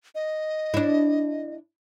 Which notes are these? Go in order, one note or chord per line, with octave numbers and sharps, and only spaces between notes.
D#5
D4 E4